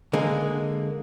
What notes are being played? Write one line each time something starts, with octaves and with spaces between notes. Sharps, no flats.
D3 G#3 A#3 G#4